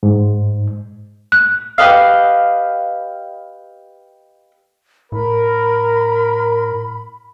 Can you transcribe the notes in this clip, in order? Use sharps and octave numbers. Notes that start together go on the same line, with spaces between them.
G#2
F#6
G4 B4 D#5 F5
A2 A#4 B5